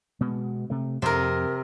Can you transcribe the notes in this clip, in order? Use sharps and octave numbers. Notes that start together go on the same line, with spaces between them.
B2 G#3 B3
C3 A3
F2 C3 A#4